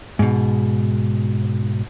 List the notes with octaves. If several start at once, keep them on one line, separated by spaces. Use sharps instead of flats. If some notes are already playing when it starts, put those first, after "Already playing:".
G#2 B2